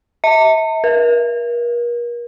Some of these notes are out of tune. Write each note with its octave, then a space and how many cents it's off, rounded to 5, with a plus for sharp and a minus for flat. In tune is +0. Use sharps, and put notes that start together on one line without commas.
E5 -40
A#4 +40